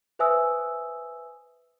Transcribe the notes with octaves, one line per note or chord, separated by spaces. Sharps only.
B4 C5 E5 G#5 D#6 E6